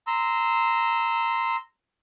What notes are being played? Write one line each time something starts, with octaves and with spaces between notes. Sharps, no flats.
A#5 C6 E6